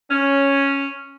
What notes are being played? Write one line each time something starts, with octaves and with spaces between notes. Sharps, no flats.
C#4